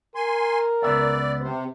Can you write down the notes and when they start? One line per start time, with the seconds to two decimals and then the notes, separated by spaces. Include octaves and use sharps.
0.15 A#4 G#5 C6
0.82 C#2 B3 D5 E5
1.41 C3 C5